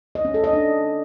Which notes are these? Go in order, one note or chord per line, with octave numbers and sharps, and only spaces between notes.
D#5
C#4
A4
D#5
D4